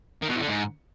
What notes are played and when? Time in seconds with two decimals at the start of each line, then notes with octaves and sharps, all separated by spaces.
0.22 D#3
0.28 B2
0.35 E2
0.41 D3
0.48 G#2